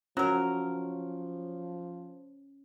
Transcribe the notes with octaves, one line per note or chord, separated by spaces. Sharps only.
F3 F#3 C#4 A#4